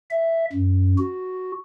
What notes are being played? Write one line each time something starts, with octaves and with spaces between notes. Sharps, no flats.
E5
F#2
F#4